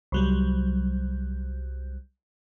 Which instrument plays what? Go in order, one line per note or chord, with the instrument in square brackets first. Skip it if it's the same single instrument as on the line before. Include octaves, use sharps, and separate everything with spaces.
[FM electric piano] C2 F#3 G3